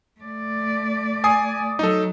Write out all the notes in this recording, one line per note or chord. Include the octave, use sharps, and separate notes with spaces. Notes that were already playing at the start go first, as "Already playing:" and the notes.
A3 D5
G#5 D#6 C7
F#3 D#4 A4